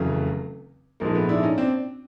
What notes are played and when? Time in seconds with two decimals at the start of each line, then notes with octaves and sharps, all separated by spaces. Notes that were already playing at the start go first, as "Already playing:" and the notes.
Already playing: F1 E2 C#3 F#3 A3
1.00 A#1 G#2 F3 G#3 A#3
1.15 A3 B3
1.29 D4 E4
1.43 C#4 D#4
1.58 C4 D4